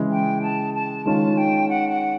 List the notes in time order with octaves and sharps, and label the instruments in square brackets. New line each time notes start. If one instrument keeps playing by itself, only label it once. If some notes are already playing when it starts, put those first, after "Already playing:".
Already playing: [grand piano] C#3 E3 G#3
[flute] G5
A5
A5
[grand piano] D#3 G#3 C#4 F4 [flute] A5
[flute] G5
F#5
F#5